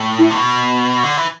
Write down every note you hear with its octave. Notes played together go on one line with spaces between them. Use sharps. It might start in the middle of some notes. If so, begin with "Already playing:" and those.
Already playing: A2
E4
C3
B2
D3
E3